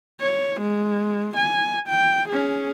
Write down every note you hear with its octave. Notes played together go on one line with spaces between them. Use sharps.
C#5
G#3
G#5
G5
C#4 G#4